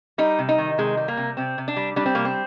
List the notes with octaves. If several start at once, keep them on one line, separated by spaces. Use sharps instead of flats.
G3 D#4
C3
D#4
D#3
C3 G#3
G3
A#3
C3
C3 C4
C3
D4
G3
G3 D4
C4
C3 A#3
C4